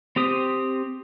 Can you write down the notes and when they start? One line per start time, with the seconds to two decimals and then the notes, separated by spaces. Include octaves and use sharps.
0.16 C4 G4 D#6